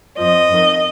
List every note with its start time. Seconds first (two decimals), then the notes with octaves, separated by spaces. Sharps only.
0.18 F2 F3 D#5
0.50 F2 D#3